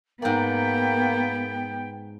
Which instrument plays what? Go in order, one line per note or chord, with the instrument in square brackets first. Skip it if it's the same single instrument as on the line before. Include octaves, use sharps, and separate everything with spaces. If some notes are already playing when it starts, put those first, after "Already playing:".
[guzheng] G#2 D5 [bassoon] A#3 [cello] B3 [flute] G5